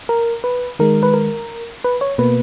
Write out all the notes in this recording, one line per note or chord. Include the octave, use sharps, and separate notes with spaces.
A#4
B4
D#3 G#3 A#4
B4
A#4
B4
C#5
B2 A#3 B4